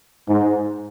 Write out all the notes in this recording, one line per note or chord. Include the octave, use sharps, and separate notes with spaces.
G#2